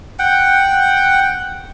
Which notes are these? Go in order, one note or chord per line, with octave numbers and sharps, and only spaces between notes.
F#5 G5